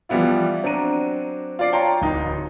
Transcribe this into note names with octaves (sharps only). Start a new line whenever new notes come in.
E3 F3 G3 B3 E4 F4
F#3 C4 D4 F#4 A#5 D#7
F4 D5 C7
F4 C#5 G5 A5 A#5 C6
D1 D#4